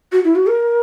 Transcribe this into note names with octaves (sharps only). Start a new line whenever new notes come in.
F#4
E4
F#4
A#4